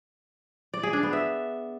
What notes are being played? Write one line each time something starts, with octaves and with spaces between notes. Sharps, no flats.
D5
G#4
D4
B3
E5